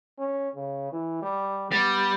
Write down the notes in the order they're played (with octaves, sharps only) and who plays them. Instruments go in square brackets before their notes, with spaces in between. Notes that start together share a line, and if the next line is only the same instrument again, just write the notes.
[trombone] C#4
C#3
E3
G3
[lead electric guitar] G3 [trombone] B3